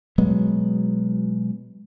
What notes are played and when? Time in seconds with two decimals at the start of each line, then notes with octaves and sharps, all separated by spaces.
0.18 B2 F#3 G#3 B3